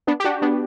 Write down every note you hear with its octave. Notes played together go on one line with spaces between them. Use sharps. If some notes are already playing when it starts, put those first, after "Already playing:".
B3 D4
G4
D4 F#4
B3 D4